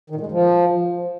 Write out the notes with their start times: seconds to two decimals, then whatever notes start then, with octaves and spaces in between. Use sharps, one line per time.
0.10 D#3
0.15 A#2
0.21 G#3
0.26 F#2
0.32 F3